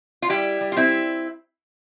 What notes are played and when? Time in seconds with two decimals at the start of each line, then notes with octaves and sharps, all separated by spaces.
0.22 F4
0.29 G3 E4 G4
0.61 G3
0.72 F4
0.77 C4 E4